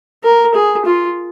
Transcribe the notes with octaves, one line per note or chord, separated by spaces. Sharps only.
A#4
G#4
F4